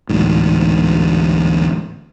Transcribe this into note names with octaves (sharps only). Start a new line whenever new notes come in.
A1 D2 G#2